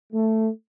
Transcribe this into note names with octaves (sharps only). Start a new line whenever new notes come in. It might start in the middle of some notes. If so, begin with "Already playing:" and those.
A3